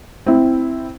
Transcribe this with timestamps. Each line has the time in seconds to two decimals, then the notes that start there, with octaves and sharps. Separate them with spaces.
0.26 C4 E4